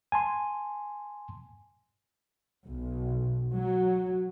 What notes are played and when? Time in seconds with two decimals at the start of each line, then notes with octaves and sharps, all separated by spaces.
0.12 G#5 A5 C6
2.65 B1
3.52 F#3